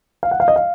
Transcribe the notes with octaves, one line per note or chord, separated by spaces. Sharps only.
F5
F#5
F5
D#5
F5